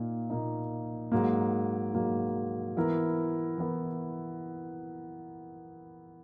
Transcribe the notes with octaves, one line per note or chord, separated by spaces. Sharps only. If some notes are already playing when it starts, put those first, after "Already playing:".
Already playing: A#2 A#3 D#4
A#2 A#3 D#4
G#2 F#3 A#3
G#2 F#3 A#3
E3 B3 E4 A#4
E3 B3 E4 A#4